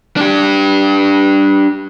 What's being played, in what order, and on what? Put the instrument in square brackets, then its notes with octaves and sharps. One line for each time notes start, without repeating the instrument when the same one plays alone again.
[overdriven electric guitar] D4 G4